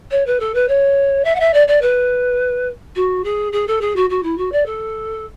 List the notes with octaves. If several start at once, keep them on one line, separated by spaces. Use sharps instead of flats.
C#5
B4
A4
B4
C#5
E5
F#5
E5
D5
D5
B4
F#4
G#4
G#4
A4
G#4
F#4
F#4
E4
F#4
D5
A4